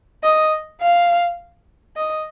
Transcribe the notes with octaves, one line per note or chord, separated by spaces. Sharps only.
D#5
F5
D#5